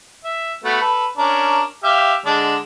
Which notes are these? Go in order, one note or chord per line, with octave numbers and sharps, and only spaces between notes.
E5
A3 B3 F#4
A4 B4
C#4 D4 A#4
G4 E5 F5
D3 G#3 D4